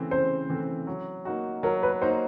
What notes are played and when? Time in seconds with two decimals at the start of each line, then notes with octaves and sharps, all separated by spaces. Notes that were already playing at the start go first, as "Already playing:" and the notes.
Already playing: C#3 E3 A3 C4
0.11 C#3 C5
0.50 E3 A3 C4
0.87 F#3
1.25 A#3 D#4 F#4
1.63 F#3 A#4
1.83 B4
2.02 A#3 D#4 F#4 C5